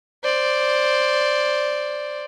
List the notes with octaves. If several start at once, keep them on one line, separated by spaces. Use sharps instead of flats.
C5 D5